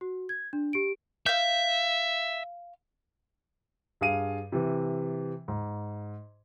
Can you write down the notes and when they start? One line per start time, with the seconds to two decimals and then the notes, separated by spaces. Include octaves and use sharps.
0.01 F#4
0.29 G#6
0.53 D4
0.73 G4 D7
1.26 E5 F5 G6
4.01 G2 G#4 F5 D#7
4.52 C3 E3
5.48 G#2